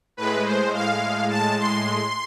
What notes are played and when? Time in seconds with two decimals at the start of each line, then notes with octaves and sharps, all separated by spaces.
0.17 A2 G#3 B4
0.45 C5
0.73 F5
1.30 A5
1.59 C6